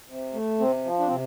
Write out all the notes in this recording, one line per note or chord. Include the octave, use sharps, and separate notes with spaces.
C3
A3
C3 C4
F3
D4
C3 C4